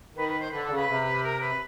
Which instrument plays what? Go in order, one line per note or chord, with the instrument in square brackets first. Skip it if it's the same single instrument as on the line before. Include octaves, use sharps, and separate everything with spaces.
[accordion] D#3 [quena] B4
[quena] B4
C5
[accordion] D3 [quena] B4
[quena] A4
[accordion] C#3
[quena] B4
[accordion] C3
[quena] A#4
B4